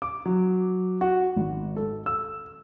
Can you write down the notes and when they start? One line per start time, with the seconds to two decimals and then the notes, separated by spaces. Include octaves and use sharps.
0.02 D6
0.26 F#3
1.01 F#4
1.36 G#1
1.76 A4
2.06 E6